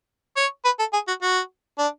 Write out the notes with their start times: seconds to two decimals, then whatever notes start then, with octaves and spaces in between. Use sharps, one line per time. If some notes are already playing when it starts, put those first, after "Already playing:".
0.36 C#5
0.65 B4
0.79 A4
0.93 G#4
1.07 F#4
1.22 F#4
1.78 D4